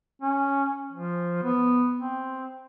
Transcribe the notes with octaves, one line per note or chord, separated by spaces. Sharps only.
C#4
F3
B3
C4